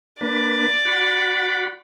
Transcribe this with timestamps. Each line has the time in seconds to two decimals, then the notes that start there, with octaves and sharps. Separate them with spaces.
0.21 A#3 D4 B4 D5
0.85 F#4 F#5 B5